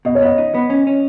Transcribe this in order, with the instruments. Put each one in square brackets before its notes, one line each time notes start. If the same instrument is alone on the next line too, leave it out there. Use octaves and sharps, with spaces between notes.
[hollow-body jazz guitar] B2 [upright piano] D#5
[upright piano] C#5
[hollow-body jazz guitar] B3 [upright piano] D#5
[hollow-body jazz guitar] D#4
B3
C#4
C#4